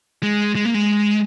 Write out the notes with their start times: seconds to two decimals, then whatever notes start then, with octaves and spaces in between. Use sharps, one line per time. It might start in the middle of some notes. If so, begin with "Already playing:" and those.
0.23 G#3
0.55 G#3
0.65 A#3
0.74 G#3